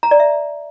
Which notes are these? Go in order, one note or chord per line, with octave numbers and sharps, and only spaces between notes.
A#5
D5
E5